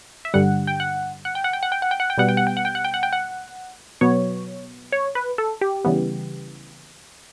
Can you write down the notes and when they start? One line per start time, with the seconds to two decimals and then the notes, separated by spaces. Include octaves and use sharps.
0.25 E5
0.34 G2 D3 G3 F#5
0.67 G5
0.80 F#5
1.25 F#5
1.35 G5
1.44 F#5
1.53 G5
1.63 F#5
1.72 G5
1.82 F#5
1.91 G5
2.00 F#5
2.10 G5
2.18 B2 G3 B3 F#5
2.29 G5
2.37 F#5
2.47 G5
2.57 F#5
2.65 G5
2.75 F#5
2.85 G5
2.94 F#5
3.03 G5
3.13 F#5
4.01 B2 F#3 B3 C#5
4.92 C#5
5.15 B4
5.38 A4
5.61 G4
5.85 C#3 E3 G3 B3